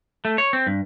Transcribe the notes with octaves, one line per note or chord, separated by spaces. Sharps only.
A3
C#5
C4
G2